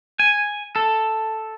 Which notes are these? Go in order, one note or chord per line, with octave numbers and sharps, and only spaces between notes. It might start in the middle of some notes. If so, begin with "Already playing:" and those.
G#5
A4